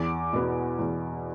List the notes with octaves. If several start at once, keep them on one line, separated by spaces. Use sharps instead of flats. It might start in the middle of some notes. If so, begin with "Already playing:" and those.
Already playing: E2 D6
B2 B3
E2